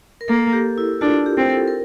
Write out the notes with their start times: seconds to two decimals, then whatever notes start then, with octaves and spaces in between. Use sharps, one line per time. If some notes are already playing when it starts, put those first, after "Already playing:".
0.21 A#4
0.28 A#3 A4
0.53 G4
0.78 E4
1.01 D4 F4
1.26 G4
1.37 C4
1.49 A4
1.67 A#4